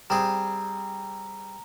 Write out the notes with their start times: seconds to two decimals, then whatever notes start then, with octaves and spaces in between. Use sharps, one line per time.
0.10 G3 C4 G#4 A#5